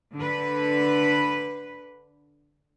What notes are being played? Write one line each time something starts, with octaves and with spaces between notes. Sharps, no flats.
D3 B4